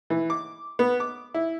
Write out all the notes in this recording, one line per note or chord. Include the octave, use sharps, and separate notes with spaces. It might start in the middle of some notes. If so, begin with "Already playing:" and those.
E3
D6
B3
D6
E4